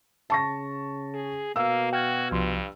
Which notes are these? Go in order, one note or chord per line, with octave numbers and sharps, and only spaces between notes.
C#3 A5 C#6 A#6
G#4
B2 A#3 F5 E6
F#4 G5 F6 G#6
C2 G2 F3 C6